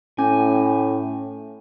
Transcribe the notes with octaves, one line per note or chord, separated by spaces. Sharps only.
A2 C#4 G#5